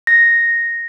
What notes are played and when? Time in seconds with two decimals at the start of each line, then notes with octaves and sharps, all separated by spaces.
0.07 A#6